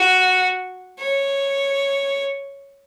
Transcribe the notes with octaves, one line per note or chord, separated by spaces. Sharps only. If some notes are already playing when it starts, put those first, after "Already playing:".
Already playing: F#4
C#5